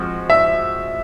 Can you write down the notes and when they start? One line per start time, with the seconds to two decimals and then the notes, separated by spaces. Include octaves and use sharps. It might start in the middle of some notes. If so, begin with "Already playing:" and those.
Already playing: F3 G#3 C4 F#4
0.30 E5